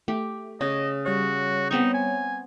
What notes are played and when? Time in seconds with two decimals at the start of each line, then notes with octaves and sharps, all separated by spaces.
0.08 A3 G4
0.61 C#3 C#5 D#5
1.06 G3 F#4 C#5
1.71 B3 C4 D#4 C#6
1.94 G#5